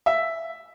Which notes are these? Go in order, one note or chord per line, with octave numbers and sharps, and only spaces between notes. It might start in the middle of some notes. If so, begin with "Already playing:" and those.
E5